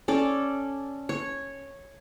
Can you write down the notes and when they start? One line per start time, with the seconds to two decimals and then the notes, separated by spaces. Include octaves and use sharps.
0.08 C#4 A4 D5
1.09 C#5